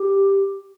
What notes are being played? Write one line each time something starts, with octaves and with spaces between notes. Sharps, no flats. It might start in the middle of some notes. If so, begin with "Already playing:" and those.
Already playing: G4